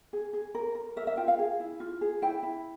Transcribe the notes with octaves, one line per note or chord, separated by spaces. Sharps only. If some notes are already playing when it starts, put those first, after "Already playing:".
G#4
G#4
A#4
A#4
A#4 E5
E5
F4 G5
F5
G#4
E4
F4
G#4
E4 G5
E4